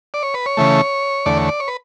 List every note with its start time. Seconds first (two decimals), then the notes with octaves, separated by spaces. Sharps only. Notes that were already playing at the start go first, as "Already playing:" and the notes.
0.14 D5
0.23 C#5
0.34 B4
0.46 C#5
0.57 C#3 E3 A3
1.26 E2 D3 A3 D5
1.37 C#5
1.49 D5
1.60 C#5
1.68 B4